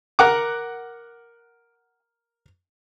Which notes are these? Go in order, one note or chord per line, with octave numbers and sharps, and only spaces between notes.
A#4 F#5 D6